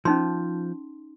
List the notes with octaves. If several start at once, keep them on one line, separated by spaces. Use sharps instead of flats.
F3 C#4 D#4 C6